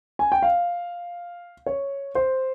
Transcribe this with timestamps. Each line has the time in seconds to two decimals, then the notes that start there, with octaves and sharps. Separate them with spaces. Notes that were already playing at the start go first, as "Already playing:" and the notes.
0.19 G#5
0.32 G5
0.42 F5
1.66 C#5
2.15 C5